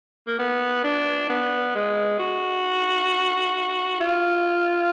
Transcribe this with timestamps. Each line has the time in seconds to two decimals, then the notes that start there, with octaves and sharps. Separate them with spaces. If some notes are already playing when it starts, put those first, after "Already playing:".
0.27 A#3
0.39 B3
0.84 D4
1.30 B3
1.75 G#3
2.19 F#4
4.00 F4